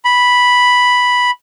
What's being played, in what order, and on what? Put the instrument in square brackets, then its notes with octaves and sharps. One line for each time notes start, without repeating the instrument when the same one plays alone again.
[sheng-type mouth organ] B5